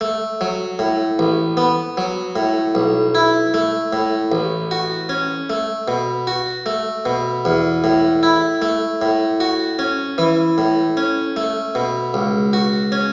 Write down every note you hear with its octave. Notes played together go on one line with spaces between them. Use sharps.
A3
F#3
A2
A1
B3
F#3
A2
B1
E4
A3
A2
A1
F#4
C#4
A3
B2
F#4
A3
B2
E2
A2
E4
A3
A2
F#4
C#4
E3
A2
C#4
A3
B2
C#2
F#4
C#4